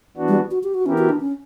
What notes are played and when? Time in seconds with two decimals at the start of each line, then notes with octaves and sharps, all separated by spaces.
0.17 E3 B3 D4 F#4
0.28 G3
0.51 F#4
0.63 G4
0.74 F#4
0.86 E3 B3 C#4 E4 G4 A#4
0.98 F#4
1.09 D4
1.20 C#4